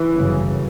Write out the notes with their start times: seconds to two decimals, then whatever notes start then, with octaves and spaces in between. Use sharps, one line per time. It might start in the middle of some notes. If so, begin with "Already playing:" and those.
Already playing: E3
0.14 G1 F#2 C#3